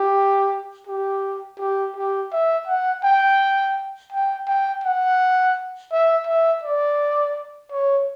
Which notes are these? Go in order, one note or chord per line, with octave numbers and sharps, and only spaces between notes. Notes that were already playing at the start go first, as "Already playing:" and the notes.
Already playing: G4
G4
G4
G4
E5
F#5
G5
G5
G5
F#5
E5
E5
D5
C#5